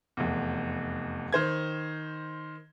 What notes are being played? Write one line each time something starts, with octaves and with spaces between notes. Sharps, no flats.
F1 E2
D#3 C5 G#6